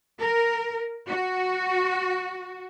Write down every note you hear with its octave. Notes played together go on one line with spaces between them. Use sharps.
A#4
F#4